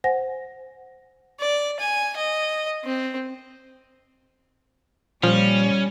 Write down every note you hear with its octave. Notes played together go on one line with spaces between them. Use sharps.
C5 F#5 G#5 A#6
D5
G#5
D#5
C4
A#2 F3 G3 C#4